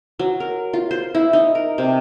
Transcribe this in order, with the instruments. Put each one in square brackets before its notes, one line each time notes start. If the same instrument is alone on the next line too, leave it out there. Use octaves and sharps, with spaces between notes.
[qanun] F#3
A#4
F4
C5
E4
D#4
A#4
C3